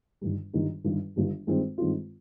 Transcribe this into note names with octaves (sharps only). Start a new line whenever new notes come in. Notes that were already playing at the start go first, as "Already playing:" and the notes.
G1 G2 D#3 G3
G1 G2 D#3 G3
G1 G2 D#3 G3
G1 G2 D#3 G3
G2 D#3 G#3 C4 F4
G2 D#3 G#3 C4 F4